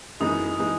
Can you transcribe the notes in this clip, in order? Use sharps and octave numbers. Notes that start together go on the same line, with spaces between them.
F#2 E3 G#3 D#4 D#6
E3 G#3 D#4